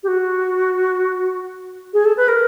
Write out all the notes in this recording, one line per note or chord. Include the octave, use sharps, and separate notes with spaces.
G4
F#4
G#4
A4
B4
A#4